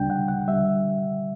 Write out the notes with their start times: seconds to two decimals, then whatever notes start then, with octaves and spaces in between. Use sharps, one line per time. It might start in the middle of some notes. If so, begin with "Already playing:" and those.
Already playing: D2 C#3 G3 D4 G5
0.10 F#5
0.28 F#5
0.48 D3 G3 E5